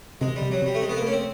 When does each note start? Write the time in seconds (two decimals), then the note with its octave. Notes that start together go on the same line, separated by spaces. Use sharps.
0.21 C3 G#3
0.36 G3
0.42 C3
0.52 F#3
0.62 C3 G3
0.75 A3
0.82 C3 G#3
0.89 B3
0.96 A#3
1.02 A3 C#4
1.12 C4